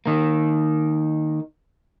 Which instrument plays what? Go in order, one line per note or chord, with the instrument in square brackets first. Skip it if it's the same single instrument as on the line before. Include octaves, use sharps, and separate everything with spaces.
[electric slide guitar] D#3 A#3